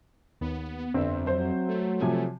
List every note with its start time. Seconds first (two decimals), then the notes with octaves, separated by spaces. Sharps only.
0.41 D#2 B3
0.94 G1 F2 C4 E5
1.27 F#3 C5
1.68 A3
2.01 C3 F3 G#5